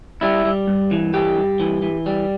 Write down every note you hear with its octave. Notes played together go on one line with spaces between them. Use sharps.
G3 E4
G3
G2
E3
G2 G4
G2
E3
E3
G3